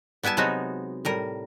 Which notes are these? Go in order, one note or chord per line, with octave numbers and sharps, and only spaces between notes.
G3 B3 E4 G#5 A5
C3 F#3 G#3 B3 D#4 F#4
A2 G3 A#4